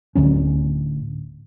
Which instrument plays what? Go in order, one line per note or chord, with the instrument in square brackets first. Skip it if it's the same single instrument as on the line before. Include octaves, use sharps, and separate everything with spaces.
[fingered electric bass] D1 D2 F#3 C#4